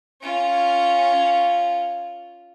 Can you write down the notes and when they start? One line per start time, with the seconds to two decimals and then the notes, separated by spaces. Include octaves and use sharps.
0.22 C#4 F4